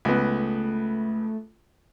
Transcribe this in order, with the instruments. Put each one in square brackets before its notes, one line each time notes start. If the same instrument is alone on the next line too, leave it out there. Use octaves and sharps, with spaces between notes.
[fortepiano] C#2 B3 [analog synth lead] A3